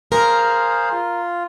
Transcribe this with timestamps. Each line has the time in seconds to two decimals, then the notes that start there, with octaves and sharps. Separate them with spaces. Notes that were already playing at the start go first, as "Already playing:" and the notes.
0.12 G#4 A#4 C5 F5
0.92 F4